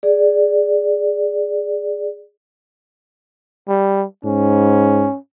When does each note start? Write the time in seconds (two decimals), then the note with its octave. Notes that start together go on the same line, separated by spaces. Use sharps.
0.03 G#4 D5
3.68 G3
4.25 G#2 C#4